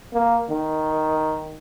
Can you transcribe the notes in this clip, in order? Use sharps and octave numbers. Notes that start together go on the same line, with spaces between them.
A#3
D#3